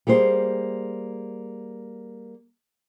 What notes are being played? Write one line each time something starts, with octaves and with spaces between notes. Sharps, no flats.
G3 A#3 G#4 C5